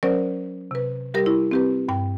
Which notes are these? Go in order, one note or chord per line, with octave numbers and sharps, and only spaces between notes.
F#3 C#4 A#4 C5 D5
C3 B4
G3 G4 A#4 A#6
E4
C4 G4 B4
G2 G5